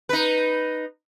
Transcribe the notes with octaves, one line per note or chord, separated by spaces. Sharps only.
D#4 B4